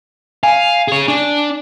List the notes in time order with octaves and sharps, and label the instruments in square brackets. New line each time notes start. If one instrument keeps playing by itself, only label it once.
[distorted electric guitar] F5 [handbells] G#5
[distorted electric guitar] G#4 C#5
D4